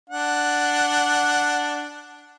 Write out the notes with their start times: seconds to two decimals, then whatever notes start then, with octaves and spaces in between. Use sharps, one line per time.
0.10 D4 F#5